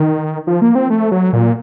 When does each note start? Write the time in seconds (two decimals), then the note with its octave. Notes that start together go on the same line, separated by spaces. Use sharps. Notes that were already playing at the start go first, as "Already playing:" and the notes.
Already playing: D#3
0.47 F3
0.62 A#3
0.75 C4
0.90 A3
1.12 F#3
1.33 A#2